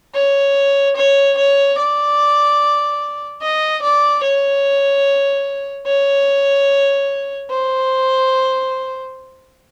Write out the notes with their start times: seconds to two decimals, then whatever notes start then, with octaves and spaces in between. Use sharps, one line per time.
0.14 C#5
0.96 C#5
1.38 C#5
1.78 D5
3.42 D#5
3.83 D5
4.23 C#5
5.86 C#5
7.50 C5